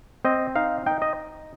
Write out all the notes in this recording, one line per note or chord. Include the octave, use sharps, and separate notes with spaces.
C4 D#5
D#4 F5
D#4 G5
D#5